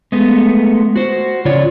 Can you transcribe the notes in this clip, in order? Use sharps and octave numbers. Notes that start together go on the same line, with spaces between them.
G#3 A3 B3
F#4 C5
C#3 F4 C#5 D5